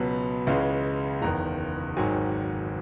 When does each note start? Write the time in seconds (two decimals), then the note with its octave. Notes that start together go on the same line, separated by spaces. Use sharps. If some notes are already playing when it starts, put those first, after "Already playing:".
Already playing: C#2 B2 F#3 B5
0.47 C#2 C#3 E3 G#3
1.22 F#1 E2 D#3 A#5
1.97 G#1 G#2 D#3 F#3 G#5